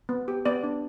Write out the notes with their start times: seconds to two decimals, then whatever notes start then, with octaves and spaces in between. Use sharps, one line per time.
0.09 B3
0.28 G4
0.45 B3 D5
0.63 D4